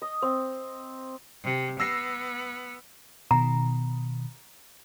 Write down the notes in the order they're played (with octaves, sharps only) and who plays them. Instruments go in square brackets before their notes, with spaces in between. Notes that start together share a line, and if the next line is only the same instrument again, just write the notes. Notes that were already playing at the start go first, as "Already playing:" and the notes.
[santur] D#5
C4
[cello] C3
[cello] B3 [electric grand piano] E6 A#6 C7
[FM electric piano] B2 D#3 [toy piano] A#5